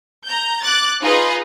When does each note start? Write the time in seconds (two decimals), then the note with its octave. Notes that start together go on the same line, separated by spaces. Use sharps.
0.25 A#5 G6
0.62 D6 F#6 A6
1.00 D#4 F4 G#4 B4 D#5